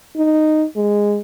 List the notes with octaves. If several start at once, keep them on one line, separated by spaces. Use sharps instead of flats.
D#4
G#3